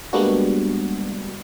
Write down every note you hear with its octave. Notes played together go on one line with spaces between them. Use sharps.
G3 G#3 A#3 B3 D4 F#4